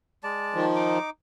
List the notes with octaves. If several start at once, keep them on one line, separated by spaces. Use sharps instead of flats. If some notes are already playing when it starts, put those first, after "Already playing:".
G#3 D5 A5
D#3 F3
D#4 D6